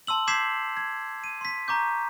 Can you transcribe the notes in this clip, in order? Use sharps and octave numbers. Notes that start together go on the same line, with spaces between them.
A5 C6 E6 F#7
D6 G6 G#6 B6 C7 E7
G#6
D#7
C6 B6
A#5 C#6 D6 G6